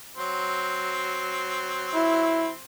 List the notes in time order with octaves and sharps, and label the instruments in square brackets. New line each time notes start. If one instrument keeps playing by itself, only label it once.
[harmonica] F#3 C4
[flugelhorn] E4